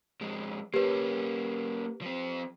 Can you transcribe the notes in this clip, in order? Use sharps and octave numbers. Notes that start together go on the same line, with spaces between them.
F2 G#3
A#3 C#4 G4 B4
F3 C4